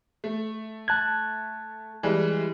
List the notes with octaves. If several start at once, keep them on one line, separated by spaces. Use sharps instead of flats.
A3
A5 F#6 G#6
E3 G3 G#3